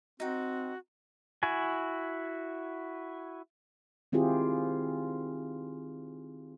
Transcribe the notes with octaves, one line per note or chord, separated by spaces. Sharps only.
C4 D#4 F#4 G5
E4 F#4 G#5
D#3 C4 E4 F4 G4 G#4